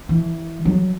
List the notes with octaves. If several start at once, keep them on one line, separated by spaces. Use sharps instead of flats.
E3
F#3